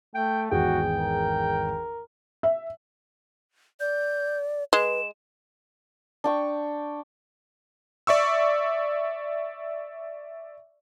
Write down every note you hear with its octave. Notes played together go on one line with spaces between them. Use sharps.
A3 G5
G#1 E2 F#4 G#4 G5
A#4
E5
D5 G6
G#3 B4 E7
D4 G5 C#6
D5 E5 C#6 E6